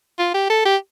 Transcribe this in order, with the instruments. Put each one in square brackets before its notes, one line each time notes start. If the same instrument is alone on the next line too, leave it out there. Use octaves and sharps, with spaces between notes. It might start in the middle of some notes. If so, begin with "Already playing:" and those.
[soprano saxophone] F4
G4
A4
G4